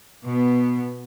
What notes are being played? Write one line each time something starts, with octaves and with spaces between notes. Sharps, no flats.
B2 B3